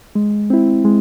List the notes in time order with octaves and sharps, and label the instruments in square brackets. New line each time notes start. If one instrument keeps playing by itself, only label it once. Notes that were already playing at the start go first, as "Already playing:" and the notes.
[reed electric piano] G#3
C4 E4
G#3